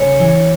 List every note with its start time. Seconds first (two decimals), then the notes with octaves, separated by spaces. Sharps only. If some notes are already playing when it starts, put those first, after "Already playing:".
Already playing: C#3 C#5
0.19 E3